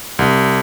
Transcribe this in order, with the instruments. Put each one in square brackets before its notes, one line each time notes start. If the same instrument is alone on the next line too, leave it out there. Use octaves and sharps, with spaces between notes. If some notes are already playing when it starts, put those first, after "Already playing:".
[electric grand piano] C2